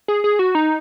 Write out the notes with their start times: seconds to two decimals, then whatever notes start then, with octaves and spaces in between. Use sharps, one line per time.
0.08 G#4
0.24 G#4
0.39 F#4
0.55 D#4